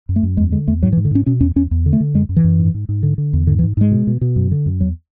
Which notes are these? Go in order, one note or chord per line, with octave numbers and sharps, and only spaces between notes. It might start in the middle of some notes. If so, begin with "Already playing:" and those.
F#2
A3
F#2
E2 G#3
D3 G#3
E2 A3
G#2 F#3
E3
G#2
D3
G#2 C#4
B2 C#4
E2 C#4
E2 C#4
E2
D3
A3
D3
F#2 G#3
F#2
E3
F#2
G#2
G#2
G#2
D3
D3
E2
G#2 D3
E3
G#2
G#2 G#3
B2
B2
B2
F#2
D3
F#2
E2 F#3